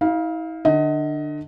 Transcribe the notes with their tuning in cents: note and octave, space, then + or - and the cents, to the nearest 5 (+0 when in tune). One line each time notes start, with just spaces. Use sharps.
E4 -45 F5 +0
D3 +25 D#5 +20